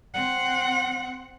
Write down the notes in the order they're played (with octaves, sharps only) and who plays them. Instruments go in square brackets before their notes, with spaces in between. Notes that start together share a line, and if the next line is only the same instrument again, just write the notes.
[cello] C4 F#5